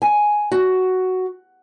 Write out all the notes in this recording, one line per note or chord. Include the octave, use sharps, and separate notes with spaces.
G#5
F#4